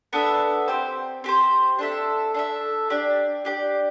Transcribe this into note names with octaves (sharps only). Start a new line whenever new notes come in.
B3 D4 A4 E5
C4 G4 C5
C4 G4 C5
D4 A4 E5
D4 A4 E5
D4 G4 D5
D4 G4 D5